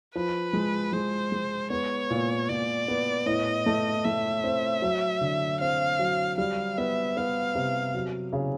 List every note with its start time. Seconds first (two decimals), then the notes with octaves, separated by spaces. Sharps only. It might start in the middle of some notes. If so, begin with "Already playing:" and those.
0.15 F3 B4
0.53 G#3
0.93 G#3 C5
1.32 G#3
1.70 B3 C#5
2.10 A#2
2.49 A#2 D5
2.88 B3
3.26 A2 D#5
3.66 A3
4.05 A3 E5
4.44 C4
4.82 F#3
5.21 D3
5.60 C4 F5
5.99 F#3
6.38 G3 F5
6.78 B3 E5
7.16 B3 F5
7.55 C3
7.94 F#3
8.33 C#3